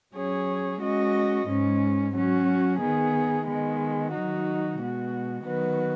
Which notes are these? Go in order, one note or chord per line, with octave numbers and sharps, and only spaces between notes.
F#3 C#4 G#4 C#5
G#3 C#4 F#4 D#5
G#2 G#3 C#4
F#3 C#4 F#4
D#3 B3 G#4
D#3 G#3 B3
D#3 F#3 D#4 F#4
B2 G#3 B3 F#4
D#3 F#3 B3 F#4 B4